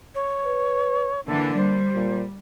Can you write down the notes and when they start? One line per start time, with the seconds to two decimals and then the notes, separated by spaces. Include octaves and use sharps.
0.14 C#5
0.44 B4
1.27 D3 E3 A#3 D4 A4
1.57 G3 C5
1.95 A#2